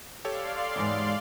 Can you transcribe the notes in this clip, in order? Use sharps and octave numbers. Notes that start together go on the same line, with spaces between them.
G4 A4 C#5 D5 F5 C6
E2 G#2